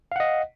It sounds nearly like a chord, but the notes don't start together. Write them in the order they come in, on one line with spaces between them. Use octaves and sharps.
F5 F#5 D#5